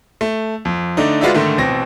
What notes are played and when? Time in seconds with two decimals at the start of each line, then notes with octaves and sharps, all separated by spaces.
0.21 A3
0.65 F2
0.97 D3 A3 D4 D#4
1.21 G#3 F4 F#4 B4 D5 E5
1.35 G#2 D3 D#3 A3
1.58 A1 B2 C4 A#6